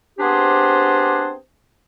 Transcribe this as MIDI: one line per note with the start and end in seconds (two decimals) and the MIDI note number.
0.19 1.33 59
0.19 1.33 60
0.19 1.33 62
0.19 1.33 67
0.19 1.33 68
0.19 1.33 72